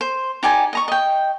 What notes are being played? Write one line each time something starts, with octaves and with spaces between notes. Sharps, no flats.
C5
D#4 G4 D5 G#5
D#5 A#5 C#6
D#5 G5